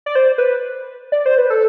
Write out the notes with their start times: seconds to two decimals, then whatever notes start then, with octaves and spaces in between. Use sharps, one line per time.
0.06 D5
0.15 C5
0.38 B4
1.12 D5
1.26 C5
1.38 B4
1.50 A4